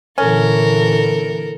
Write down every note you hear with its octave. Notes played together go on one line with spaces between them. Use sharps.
A#2 D3 E3 C#4 A4 A#4